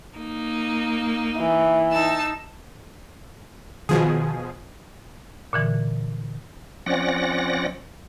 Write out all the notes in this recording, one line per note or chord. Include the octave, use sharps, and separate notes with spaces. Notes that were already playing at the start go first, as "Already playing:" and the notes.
A#3 D#4
E3
D#4 A5 E6
B2 D#3 F3 G#4
A#2 D3 E3
F3 C4 C#4 D5 F#5 A#6